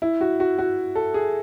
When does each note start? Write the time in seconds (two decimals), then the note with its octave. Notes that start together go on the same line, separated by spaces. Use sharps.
0.02 E4
0.21 F#4
0.40 F#4
0.58 F#4
0.95 A4
1.14 G#4